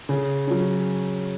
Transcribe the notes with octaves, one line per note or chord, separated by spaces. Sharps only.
C#3
F#3 C#4